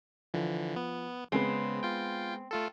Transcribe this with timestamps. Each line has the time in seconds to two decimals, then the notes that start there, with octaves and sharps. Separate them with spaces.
0.34 D3 E3 F3
0.76 B3
1.32 C#3 G#3 B3 C4
1.83 F4 G5
2.51 A3 F4 A4